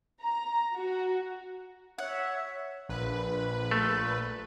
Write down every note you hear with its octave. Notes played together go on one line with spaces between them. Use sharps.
A#5
F#4
C#5 E5 F#5
A#1 B4
A3